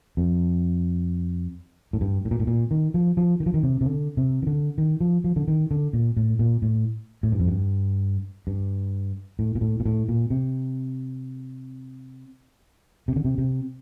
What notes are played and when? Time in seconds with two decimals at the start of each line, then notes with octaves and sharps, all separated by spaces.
0.17 F2
1.93 A2
2.01 G2
2.25 A2
2.31 A#2
2.40 A2
2.47 A#2
2.71 D#3
2.94 F3
3.17 F3
3.40 D#3
3.46 F3
3.54 D#3
3.63 C3
3.81 C3
3.86 D3
4.17 C3
4.42 D#3
4.47 D3
4.78 D#3
5.01 F3
5.24 F3
5.36 D3
5.48 D#3
5.71 D3
5.93 A#2
6.17 A2
6.39 A#2
6.62 A2
7.23 A2
7.32 G2
7.40 F2
7.48 G2
8.47 G2
9.39 A2
9.55 A#2
9.61 A2
9.80 A#2
9.86 A2
10.08 A#2
10.30 C3
13.08 C3
13.16 D3
13.25 C3
13.38 C3